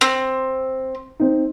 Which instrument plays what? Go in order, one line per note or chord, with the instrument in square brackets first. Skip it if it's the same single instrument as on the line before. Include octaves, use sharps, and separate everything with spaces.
[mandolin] C4
[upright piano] C4 D#4